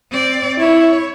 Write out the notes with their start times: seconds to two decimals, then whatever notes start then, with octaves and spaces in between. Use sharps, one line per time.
0.10 C4 D5
0.59 E4 C#5